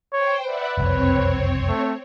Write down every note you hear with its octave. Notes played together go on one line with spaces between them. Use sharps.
C5 C#5 G5
B4 D5 E5 F#5
F#1 C2 F2 C4 C#5
A3